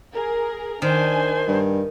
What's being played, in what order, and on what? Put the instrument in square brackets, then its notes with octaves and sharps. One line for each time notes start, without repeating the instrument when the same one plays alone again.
[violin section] G#4 A#4
[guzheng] D#3 [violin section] D4 G#5 [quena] C5
[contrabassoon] G2